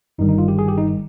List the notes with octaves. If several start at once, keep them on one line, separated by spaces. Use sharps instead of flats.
G1 G2 D#3 G3 D#4
D#4
F4
G4
G#4
G4
D#4